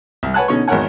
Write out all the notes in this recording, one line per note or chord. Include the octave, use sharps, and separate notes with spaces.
C2
B4 C#5 F#5 G#5 A5 F#6
B2 D3 C#4 D#4 C#5 C#6
G#1 E2 A#4 C#5 F#5 G#5